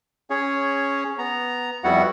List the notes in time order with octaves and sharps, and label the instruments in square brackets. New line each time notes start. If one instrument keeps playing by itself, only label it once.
[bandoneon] C#4 G#4 C#5
B3 A#5
F2 G3 B3 E4 F#4 F#5